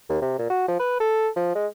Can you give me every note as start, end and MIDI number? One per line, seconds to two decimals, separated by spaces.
0.09 0.17 39
0.22 0.35 48
0.38 0.46 46
0.50 0.66 66
0.68 0.75 53
0.79 1.00 71
1.00 1.29 69
1.36 1.54 53
1.55 1.66 56